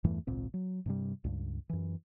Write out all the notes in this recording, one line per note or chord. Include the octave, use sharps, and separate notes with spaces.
E2 G2 E3 A3
G#1 C#2 A#2 C4
F#3
G2 C3 G3
C#2 G2
F#2 E3